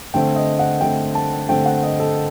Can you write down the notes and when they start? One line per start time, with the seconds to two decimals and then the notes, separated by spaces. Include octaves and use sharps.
0.14 D3 A3 C4 G5
0.36 D#5
0.59 F#5
0.81 D3 A3 C4 G5
1.15 A5
1.49 D3 A3 C4 G5
1.65 F#5
1.83 D#5
1.99 A4